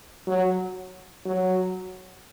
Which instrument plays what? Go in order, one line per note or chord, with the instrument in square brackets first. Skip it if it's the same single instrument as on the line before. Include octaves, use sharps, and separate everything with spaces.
[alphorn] F#3
F#3